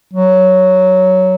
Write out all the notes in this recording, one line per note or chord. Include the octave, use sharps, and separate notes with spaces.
F#3